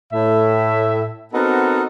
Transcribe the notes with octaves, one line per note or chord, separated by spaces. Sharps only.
A2 E5
B3 C4 D#4 F#4 A4 A#4